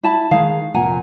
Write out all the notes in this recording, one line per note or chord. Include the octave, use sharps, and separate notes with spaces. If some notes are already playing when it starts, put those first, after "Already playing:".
E4 A5 B5
D#3 G#3 G#4 F5
F1 A#2 F#5 G#5 A#5